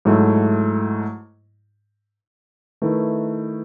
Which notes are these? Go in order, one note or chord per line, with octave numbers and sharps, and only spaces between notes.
G#2 F#3 A3 E4
D#3 A3 E4 B4